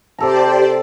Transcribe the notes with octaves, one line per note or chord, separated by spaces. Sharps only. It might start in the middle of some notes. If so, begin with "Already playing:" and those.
C3 G4 A4 C5 D5 A#5